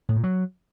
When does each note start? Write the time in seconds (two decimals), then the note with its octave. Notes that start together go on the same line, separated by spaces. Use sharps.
0.09 A2
0.16 A#2
0.24 F#3